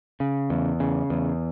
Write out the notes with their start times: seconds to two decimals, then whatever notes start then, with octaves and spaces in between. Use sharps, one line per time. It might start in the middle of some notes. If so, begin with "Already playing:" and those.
0.20 C#3
0.50 E2
0.80 C#3
1.10 E2